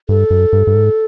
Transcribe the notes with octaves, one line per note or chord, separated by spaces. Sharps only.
G2 A4
F#2
G2
G2
G#2